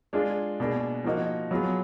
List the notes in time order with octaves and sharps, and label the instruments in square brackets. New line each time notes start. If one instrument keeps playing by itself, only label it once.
[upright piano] G#3 D4 F4 G#4
B2 A#3 D4 G#4
F3 A#3 D#4 F#4
F#3 B3 F4 G#4